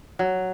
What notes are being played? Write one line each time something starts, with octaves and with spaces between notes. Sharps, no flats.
F#3